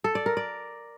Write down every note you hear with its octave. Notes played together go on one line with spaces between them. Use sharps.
A4
D5
A#4
D5